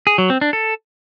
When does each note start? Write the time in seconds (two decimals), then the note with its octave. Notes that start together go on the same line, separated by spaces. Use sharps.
0.07 G#4
0.18 F#3
0.30 C4
0.41 D4
0.53 A4